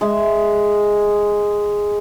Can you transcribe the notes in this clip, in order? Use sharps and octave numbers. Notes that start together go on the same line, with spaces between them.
G#3 E5